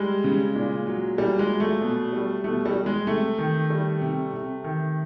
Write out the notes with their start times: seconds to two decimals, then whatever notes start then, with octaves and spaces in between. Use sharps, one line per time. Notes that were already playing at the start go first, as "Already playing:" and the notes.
Already playing: G3 G#3
0.24 C#3
0.55 A#2
0.87 F#3
1.18 A#2 G3
1.39 G#3
1.50 F#3
1.60 A3
1.81 B2
2.13 G3
2.44 B2 A3
2.66 G3
2.76 G3
2.86 G#3
3.07 C3 A3
3.38 D#3
3.70 G3
4.02 C3
4.33 C3
4.64 D#3